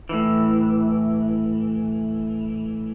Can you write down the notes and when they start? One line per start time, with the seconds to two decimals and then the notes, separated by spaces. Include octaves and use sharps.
0.09 A2 E3